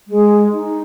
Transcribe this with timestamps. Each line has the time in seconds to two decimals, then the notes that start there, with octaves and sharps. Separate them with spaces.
0.08 G#3
0.53 D#4